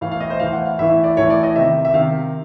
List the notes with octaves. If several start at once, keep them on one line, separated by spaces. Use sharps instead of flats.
A2 E3 F5
F5
D#5
C5
A2 E3 F5
F#5
F5
A2 E3 E5
E5
D5
A2 E3 C#5
D5
D#5
C3 D#3 E5
E5
C3 D#3 F5